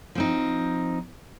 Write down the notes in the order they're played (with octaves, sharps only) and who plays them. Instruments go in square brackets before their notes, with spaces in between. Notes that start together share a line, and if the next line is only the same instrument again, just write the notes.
[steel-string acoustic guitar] F3 C4 D#4